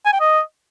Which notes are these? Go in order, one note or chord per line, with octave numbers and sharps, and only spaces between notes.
G#5
G5
D#5